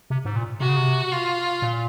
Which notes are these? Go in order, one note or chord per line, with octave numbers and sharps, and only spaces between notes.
C3
G#2
A#2
C3 F#4
C#3
C3
F4
A#2